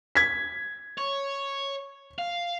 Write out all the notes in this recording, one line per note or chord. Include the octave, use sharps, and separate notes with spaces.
G#6 B6
C#5
F5